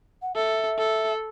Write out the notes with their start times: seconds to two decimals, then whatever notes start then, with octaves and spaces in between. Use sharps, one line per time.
0.22 F#5
0.35 A4 E5
0.79 A4